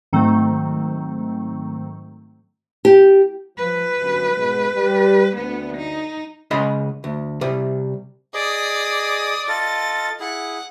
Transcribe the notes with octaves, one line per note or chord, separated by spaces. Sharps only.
G#2 D#3 F#3 A3 C4
G4
F3 B4
G1 F#2
G#2 B2 G#3
G3
D2 B3
D#4
C#3 G#3 D#5 B5 C6
D2
C3 G3
G#4 D5 D#5 D6 D#6
F4 A4 D#5 A6
E4 G#4 F#5